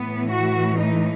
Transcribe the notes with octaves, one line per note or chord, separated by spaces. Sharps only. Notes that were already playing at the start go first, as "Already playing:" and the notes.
Already playing: A2 E3 B3
F#4
D#4